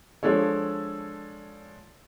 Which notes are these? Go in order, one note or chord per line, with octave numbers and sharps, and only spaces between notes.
F3 G#3 D4 A4 C#5